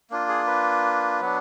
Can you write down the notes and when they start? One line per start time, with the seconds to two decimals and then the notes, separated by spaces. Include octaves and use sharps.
0.10 A#3 D4 F4
0.29 G#4
0.47 B4
1.21 F#3 B3 D4